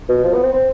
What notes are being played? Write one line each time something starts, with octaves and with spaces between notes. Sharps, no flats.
B2
F3
B3
C4
C4